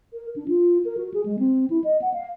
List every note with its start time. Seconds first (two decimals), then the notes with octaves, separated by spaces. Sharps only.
0.13 A#4
0.36 D4
0.48 F4
0.85 A#4
0.97 F#4
1.14 G#4
1.26 G#3
1.39 C4
1.70 E4
1.84 D#5
2.02 F#5
2.14 F5